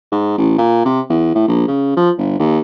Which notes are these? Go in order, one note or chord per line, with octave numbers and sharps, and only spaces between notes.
G#2
A1
A#2
C3
E2
A2
A#1
C#3
F3
G1
D#2